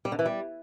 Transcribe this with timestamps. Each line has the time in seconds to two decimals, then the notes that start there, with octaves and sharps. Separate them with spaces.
0.05 G3
0.12 D3
0.19 E3
0.26 G3